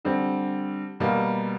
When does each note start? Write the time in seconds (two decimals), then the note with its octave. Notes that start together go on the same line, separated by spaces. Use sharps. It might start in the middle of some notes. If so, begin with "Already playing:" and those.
0.05 D3 G3 C4
1.00 B2 G3 A#3